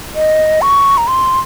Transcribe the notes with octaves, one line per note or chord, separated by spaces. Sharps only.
D#5
C#6
A#5
C6